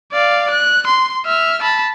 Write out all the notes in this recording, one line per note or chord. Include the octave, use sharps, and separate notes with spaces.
D5 F5
F#6
C6
E5 F6
A5 B5